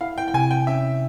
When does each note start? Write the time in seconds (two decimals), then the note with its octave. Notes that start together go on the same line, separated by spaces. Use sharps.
0.01 E4 F5
0.18 G5
0.28 G5
0.34 C3 G#5
0.51 G5
0.67 C#4 E5